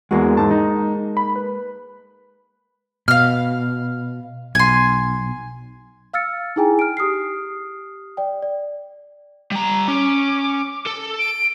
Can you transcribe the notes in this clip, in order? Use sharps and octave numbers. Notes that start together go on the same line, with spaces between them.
E2 G#3 A#3 F#4
G#2 A5
D#4
B5
B4
B2 F5 F6
B1 G#5 C6
F5 E6 F6 A6 C#7
D#4 E4 G#4 G5 G#5 A#5
F6 D7
G4 D#6 F6 C7
D5 G5
D5
G3 A#5
C#4 D6
A4
D7